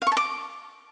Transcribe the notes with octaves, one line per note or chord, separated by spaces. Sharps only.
F5
C#6
A5
D6